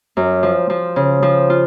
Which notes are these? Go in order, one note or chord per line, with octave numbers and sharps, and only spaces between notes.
F#2
F3
F3
C#3
F3
F4